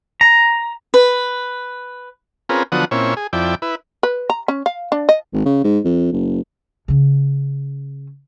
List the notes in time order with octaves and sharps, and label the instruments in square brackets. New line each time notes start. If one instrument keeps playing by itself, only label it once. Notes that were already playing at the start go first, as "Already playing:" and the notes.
[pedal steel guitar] A#5
[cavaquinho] B4
[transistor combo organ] C4 C#4 F4 G#4 A#4 B4
D3 F3 F#3 B3 F#5 D#6
A#2 C4 C#4 E4 C#5
G#4
F2 E4 D5 G5
E4 B4
[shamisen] B4
A#5
C#4
F5
D4
D#5
[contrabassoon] G#1
C#3
G#2
F2
F#1
[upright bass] C#3 C#4